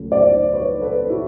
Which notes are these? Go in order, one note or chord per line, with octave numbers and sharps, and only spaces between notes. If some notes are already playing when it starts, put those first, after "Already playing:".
Already playing: C#2 C#3 F#3 A3
C5 D5
B4 C#5
A4 B4
E4 F#4